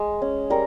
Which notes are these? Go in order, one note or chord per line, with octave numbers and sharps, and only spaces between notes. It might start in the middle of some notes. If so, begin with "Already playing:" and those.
Already playing: G#3
C#4
G3 A#4